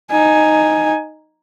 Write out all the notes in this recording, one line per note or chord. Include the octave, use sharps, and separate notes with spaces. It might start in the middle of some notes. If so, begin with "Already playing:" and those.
D#4 G#5